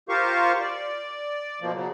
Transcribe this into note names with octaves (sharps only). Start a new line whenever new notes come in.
F4 G4 A#4 C5 F5 C#6
D5
B2 F3 A#3
C#3 F#3